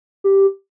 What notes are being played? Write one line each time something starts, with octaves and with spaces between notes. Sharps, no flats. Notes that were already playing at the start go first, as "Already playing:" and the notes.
G4